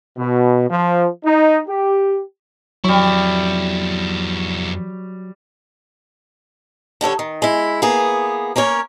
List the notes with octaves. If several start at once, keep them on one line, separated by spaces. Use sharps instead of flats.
B2
F3
D#4
G4
F2 F#3 G3 E4 C#6
D3 G3 A4 C#5
D#3
G#3 E4
A#3 B3 G#4
A#3 C#4 A#4 C#5